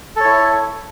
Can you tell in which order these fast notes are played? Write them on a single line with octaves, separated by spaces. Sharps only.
A4 C#5 E4